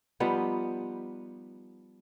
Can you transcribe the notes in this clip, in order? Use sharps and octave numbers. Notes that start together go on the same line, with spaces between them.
F3 G3 B3 D#4